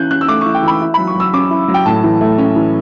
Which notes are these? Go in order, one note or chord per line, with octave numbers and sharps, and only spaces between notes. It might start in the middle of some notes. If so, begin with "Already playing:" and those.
Already playing: E3 C#4 F#6 G6
C#4 F#6
E6
A3 D6
C#6
E3
G5
E3 B5
E4
F#3 B5
C#6
F#3 E6
C#4 D6
E4
F#3
G5
A2 A5
E3
A3
C#4
E3